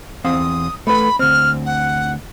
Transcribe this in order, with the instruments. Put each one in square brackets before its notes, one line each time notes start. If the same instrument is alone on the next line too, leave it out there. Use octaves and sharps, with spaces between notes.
[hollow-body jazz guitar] E2 C4 F5 [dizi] D#6
[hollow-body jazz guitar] A3 B4 [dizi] B5
[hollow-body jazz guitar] D2 C4 [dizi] F6
[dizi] F#5